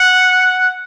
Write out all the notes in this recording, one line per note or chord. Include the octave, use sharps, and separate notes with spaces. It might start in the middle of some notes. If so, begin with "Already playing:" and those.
Already playing: F#5